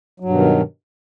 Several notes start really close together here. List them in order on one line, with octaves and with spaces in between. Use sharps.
F#3 G2 B2 D#3